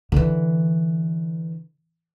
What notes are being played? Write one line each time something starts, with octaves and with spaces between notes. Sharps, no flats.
D3 E3